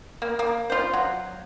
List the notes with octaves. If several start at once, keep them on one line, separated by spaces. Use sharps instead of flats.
A#3
A#3
F4 C5
F#3